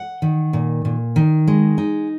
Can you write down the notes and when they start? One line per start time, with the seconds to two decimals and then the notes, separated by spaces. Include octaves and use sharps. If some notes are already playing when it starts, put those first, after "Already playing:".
Already playing: F#5
0.22 D#3
0.53 A#2
0.85 A#2
1.16 D#3
1.47 G#3
1.78 D#4